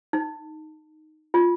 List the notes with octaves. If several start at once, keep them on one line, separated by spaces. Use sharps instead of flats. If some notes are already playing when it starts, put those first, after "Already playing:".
D#4
F4